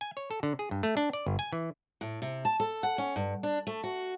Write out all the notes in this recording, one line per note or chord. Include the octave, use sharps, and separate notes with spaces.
G#5
C#5
A4
D3
G#4
G2
A3
D4
D5
G1
G#5
E3
A2
C3
A5
A4
F#5
C#4
G2
D4
A3
F#4